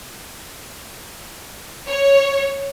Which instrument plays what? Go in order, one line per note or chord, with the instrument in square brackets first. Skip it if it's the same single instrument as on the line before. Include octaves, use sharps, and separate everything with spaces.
[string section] C#5